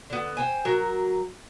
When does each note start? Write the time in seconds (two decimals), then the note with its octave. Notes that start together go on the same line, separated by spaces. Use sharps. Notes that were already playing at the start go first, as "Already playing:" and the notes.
0.10 D3 B3
0.37 C5 G5 G#5
0.65 F#3 A#4